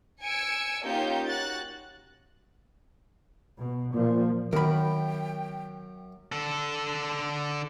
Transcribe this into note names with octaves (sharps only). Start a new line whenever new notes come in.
G#5 E6 C#7 D7
A#3 C#4 D#4 F4 G4 G6
F#4 F#6 A6
B2
A#2 F3
F#2 D#3 B3 A#4 G5 B5
D3 A4